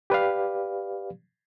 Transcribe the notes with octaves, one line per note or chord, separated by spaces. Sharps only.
G4 B4 D5 F5